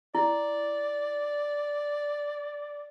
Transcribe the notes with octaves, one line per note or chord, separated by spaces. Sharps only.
E4 D5